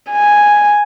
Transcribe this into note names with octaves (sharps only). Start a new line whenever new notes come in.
G#5